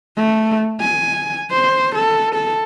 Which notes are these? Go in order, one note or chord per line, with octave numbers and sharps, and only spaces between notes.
A3
G#5
C5
A4
A4